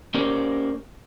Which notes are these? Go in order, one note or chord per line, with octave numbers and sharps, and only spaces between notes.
A#3 C#4 G4 A#4 C5 D5